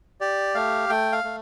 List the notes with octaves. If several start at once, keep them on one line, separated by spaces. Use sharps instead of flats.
G4 D5
A3 F5
A3 G5
F5
A3